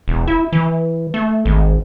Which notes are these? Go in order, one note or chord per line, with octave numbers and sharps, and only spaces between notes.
E1
E4
E3
A3
G#1